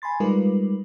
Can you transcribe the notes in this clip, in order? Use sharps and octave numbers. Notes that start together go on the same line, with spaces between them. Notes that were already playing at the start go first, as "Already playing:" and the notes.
G#5 B5 C6 A6
G3 G#3 D#4 F4 A#4 B4